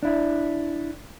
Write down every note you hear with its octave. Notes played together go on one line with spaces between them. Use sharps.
D4 E4